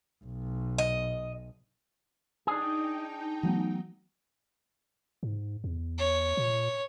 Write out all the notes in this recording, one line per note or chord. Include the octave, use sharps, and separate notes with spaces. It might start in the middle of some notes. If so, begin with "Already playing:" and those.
B1
D#5
D4 D#4 G#4 G5 G#5 C7
E3 F#3 A3 B3
G#2
E2
C#5
A#2